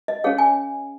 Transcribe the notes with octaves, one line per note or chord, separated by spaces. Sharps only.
D#5
C#4 G#4 C#5 F5
G#5